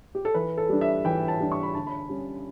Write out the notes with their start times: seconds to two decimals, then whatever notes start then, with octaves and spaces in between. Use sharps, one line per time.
0.15 G4
0.25 A4
0.34 E3 B4
0.58 A4
0.69 G3 D4
0.81 E5
1.05 E3 G5
1.28 A5
1.40 G3 D4
1.52 C#6
1.63 B5
1.75 D3 A5
1.87 B5
2.09 G3 C#4